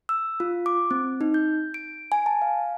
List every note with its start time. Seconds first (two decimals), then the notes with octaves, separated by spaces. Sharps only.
0.09 E6
0.40 F4
0.66 D6
0.91 C4
1.21 D#4
1.34 G6
1.74 D7
2.12 G#5
2.26 A5
2.42 F5